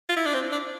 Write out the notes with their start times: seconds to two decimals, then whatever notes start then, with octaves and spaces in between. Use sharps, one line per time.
0.09 F4
0.17 E4
0.26 D4
0.34 C4
0.52 D4